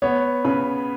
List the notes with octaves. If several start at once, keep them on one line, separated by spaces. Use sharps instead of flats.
B3 C#5
C#3 B4